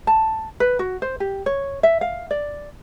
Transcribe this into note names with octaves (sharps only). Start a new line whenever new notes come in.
A5
B4
F#4
C5
G4
C#5
E5
F5
D5